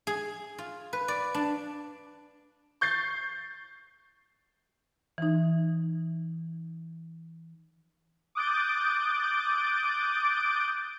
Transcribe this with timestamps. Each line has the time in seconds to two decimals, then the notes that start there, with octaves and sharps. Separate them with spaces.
0.07 G#4
0.58 F4
0.93 B4
1.08 D5
1.34 D4
2.81 C#6 G6 A6 C7
5.18 E3 D#4
8.35 D6 D#6 F#6 G6 A6 D7